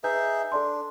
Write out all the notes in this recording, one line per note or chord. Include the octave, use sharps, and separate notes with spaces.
D#4 G#4 B4 E5 G6
D4 A4 D5 C6